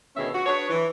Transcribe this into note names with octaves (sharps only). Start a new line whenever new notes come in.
D2 B2 D#3 C#4 G#4 E5
F#4
D4 G#4 B4 C#5
E3